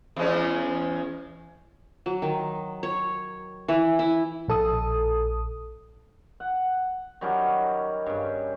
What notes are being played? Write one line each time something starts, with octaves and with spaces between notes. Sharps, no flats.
E2 G#3 C#4
F#3
D#3
C#5
E3
E4
A#1 A4 D#6
F#5
D#3 F#3 G3 C#4
G2 C#3